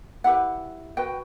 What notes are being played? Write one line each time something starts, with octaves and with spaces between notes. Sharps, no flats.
E4 G4 B4 F#5
F#4 B4 G5